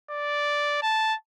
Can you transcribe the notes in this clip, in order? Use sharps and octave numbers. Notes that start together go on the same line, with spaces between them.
D5
A5